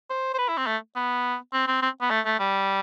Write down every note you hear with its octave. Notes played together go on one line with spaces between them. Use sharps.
C5
C5
B4
E4
C4
A3
B3
C4
C4
C4
B3
A3
A3
G3